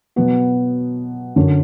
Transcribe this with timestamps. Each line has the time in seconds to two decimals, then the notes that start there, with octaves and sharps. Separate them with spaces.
0.16 B2 F#3 B3 F#4
1.36 F#2 D3 F#3 C#4